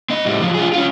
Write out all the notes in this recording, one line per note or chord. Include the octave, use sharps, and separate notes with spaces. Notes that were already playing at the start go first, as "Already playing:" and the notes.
C4 D#5
A2 G3
F3 F#3
F4 G#4
C#4 F4